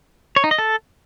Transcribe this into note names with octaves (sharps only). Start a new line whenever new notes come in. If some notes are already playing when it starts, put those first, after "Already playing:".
C#5
D#4
D#5
A4